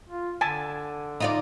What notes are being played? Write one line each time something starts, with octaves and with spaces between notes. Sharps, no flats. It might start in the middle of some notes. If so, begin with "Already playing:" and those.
F4
D3 G#5 A5
D#4 F4 D5